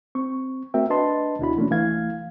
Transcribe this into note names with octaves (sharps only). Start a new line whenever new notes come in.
C4 C#6
A3 C4 F#4 A#4 E5 G5
D4 B4 D#5 A5 C6
D2 B2 D4 E4 F#4 B5
E3 A3 A#3 C#4 D4
C2 E3 A3 F5 G#6